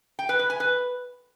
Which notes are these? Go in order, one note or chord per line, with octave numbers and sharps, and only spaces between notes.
G5
B4
B4
G#5
B4